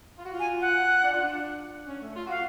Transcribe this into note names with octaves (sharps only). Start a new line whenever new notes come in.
F4
F#4
F4
G#5
F#5
D4
F4
D4
C#4
A3
F4
F#4 F5